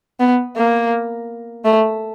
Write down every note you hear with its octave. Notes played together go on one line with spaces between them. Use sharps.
B3
A#3
A3